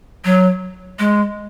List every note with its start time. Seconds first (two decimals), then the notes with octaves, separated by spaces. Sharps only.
0.25 F#3
0.99 G#3